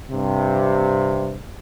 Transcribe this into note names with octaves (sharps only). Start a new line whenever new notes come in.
G2 C3